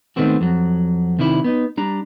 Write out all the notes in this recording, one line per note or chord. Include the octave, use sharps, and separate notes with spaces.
D#3 G#3 A3 B3 C4 F#4
F2 F#3
C3 D#3 D4 E4
B3 D#4
G3 D4 A#5